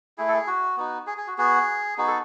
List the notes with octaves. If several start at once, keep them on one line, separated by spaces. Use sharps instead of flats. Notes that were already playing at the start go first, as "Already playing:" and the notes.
A3 E4 G#4
A4
G#4
F#4
B3 D#4 F#4
G#4
G#4
F#4
B3 F#4 G#4
B3 D#4 F#4 G#4
A4